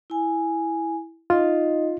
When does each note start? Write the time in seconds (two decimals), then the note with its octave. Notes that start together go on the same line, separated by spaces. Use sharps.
0.10 E4 G#5
1.30 D#4 F4 D#5